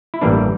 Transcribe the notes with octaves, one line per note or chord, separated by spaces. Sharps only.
E4
A1 G2 E3 G3 A#3 D4